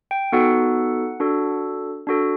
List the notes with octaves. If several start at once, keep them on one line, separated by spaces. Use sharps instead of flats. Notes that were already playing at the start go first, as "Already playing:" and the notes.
G5
B3 D#4 F#4 A4 F#5
D4 F#4 A4
D4 F#4 A4